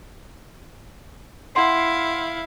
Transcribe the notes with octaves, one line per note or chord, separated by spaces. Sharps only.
E4 F5 F#5 C6 C7